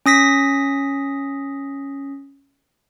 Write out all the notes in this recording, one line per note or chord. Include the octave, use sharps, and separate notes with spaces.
C#4 D#6 A#6 B6